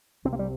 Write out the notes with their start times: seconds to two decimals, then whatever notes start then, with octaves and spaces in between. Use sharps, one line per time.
0.25 C2 C3 C4
0.33 A#3
0.39 G3